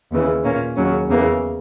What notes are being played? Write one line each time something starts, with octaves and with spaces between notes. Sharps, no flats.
D#2 C#3 E3
A#2 A#3 C#4
D#2 C#3 F#3 C#4
E2 C#3 E3 A#3